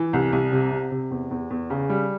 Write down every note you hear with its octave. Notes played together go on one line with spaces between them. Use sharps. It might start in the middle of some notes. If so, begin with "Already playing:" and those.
Already playing: E3
C2
C2
C3
C3
C3
E2
E2
E2
C#3
G3